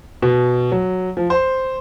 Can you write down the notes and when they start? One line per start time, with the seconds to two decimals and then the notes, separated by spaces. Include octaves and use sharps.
0.22 B2
0.72 F#3
1.17 F3
1.30 C5